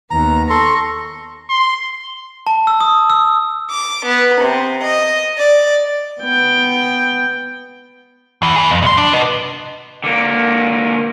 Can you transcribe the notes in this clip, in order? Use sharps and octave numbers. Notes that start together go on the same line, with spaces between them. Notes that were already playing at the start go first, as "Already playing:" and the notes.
D#2 B3 A#5
A4 C6 C#6 A#6
C6
A5
E6
D#6
E6
D6
B3
C3
D#5
D5
B3 G5
E2 E3
G#4 B4
F2
C2 C6
D4
B4 D#5
D3 A#3